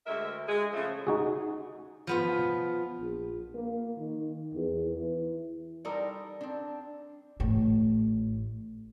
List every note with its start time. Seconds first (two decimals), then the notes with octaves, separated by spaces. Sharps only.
0.06 D2 G#3 A#4 E5
0.47 G#3 G#4
0.73 C#3 F3 A3
1.07 D#4 F#4 G#4
2.07 F3 B3 F4
3.00 A#1
3.54 A#3
3.98 D#3
4.54 E2
4.98 E3
5.85 G3 D#4 A4 A#4 C5 D5
6.41 C4 D4
7.40 A1 A2